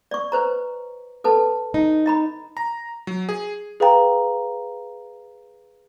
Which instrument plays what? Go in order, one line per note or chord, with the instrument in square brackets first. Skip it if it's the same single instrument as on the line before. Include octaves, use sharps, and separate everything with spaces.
[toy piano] D5 C#6
B4 C5 A#5
A4 B4 A5
[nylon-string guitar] D#4
[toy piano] D#5 A#5 B5
[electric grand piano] A#5
F#3
G#4
[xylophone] G#4 B4 F5 G5 A#5